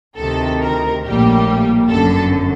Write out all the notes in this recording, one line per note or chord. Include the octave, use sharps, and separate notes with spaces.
D2 C3 D#3 A4
A#4
A#1 A2 G3 A#3 G4
G1 F#2 D3 A4